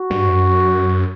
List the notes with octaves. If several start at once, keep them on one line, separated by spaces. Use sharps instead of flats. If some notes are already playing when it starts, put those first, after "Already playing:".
Already playing: F#4
G2
F#2